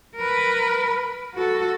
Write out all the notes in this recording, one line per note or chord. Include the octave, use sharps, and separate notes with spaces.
A#4 B4
F#4 A4